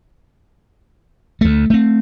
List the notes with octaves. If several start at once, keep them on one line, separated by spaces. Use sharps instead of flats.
D2 A3
A3 C4